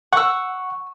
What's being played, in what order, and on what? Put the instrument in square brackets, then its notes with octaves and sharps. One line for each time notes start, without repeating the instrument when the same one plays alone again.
[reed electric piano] F#5 [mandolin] C#6 E6